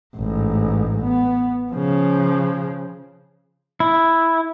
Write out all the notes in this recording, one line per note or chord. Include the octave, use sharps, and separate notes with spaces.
A1 G#2
B3
C#3 F3
E4